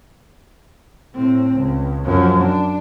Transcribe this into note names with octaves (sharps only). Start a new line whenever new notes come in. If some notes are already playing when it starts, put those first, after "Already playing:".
A2 C4
C#2
F#2 F3
D4